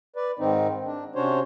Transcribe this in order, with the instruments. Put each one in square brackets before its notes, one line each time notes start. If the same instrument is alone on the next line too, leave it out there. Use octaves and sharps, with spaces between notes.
[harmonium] B4 D5
G#2 D#3 C4 D#4
D4
C3 C#4 D4 F#4 C5 C#5